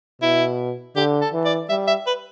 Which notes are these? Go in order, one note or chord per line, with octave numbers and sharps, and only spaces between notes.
B2 E4
D3 G4
A4
E3
D5
G3 E5
E5
B4